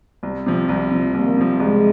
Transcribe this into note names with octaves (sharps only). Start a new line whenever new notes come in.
C2
C3 F3
C2
C3 F3
C2 A#3
C3 F3
C2 G#3